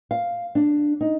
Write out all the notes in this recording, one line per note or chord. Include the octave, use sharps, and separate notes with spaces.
F5
D4
D#4